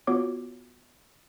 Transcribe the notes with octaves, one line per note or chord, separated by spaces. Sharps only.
B3 F4 F#4 C#5 D6